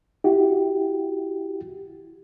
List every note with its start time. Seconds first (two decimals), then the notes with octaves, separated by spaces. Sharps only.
0.24 E4 F#4 G4